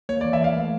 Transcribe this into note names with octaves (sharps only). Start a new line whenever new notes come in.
A#3 C#5
E3 D5
E5
E3 F5
A3